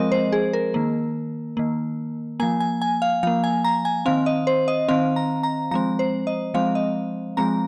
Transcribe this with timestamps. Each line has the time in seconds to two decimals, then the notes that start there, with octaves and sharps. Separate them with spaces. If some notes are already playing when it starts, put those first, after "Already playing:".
Already playing: F3 G#3 C4 A#4 D#5
0.12 C5
0.32 G#4
0.53 A#4
0.74 D#3 A#3
1.57 D#3 A#3
2.40 F3 A#3 G#5
2.60 G#5
2.82 G#5
3.02 F5
3.23 F3 A#3 F5
3.44 G#5
3.64 A#5
3.85 G#5
4.06 D#3 C4 F5
4.26 D#5
4.47 C5
4.68 D#5
4.88 D#3 C4 F5
5.16 A#5
5.43 A#5
5.71 F3 G#3 C4 A#5
5.99 C5
6.27 D#5
6.54 F3 G#3 C4 F5
6.75 D#5
7.37 F3 G#3 C4 A#5